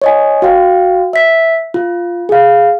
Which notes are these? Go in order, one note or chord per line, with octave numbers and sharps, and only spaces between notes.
C#5 D#5 G#5
F#4 F5 G5
E5 B6
F4
G#4 F5